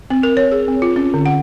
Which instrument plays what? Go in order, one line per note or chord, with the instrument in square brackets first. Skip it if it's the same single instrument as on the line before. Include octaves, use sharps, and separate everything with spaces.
[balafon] C4
A#4
C#5
G#4
C4
F4
C#4
D3
F#5